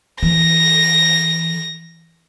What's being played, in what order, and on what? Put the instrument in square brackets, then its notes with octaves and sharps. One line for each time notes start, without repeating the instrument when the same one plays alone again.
[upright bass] E3 [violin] A#6